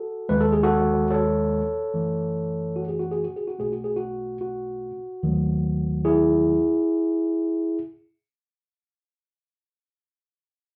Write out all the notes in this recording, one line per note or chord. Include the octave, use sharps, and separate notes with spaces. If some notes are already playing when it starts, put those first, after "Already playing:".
Already playing: F#4 A4
D#2 D#3 G#3 B4
A4
G#4
F#4 A4
A4 C#5
F#2 E3 A3
F#4
G#4
F#4
G#4
F#4
G#4
F#4
B1 B2 A3 G#4
F#4
G#4
F#4
F#4
D#2 D#3 F#3 A3
E4 G#4